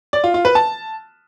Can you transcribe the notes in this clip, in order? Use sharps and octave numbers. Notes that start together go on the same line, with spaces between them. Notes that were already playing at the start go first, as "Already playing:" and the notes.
D5
F4
F4
B4
A5